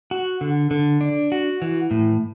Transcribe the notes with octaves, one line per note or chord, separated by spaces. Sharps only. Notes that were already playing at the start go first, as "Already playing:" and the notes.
F#4
D3
D3
D4
F#4
E3
A2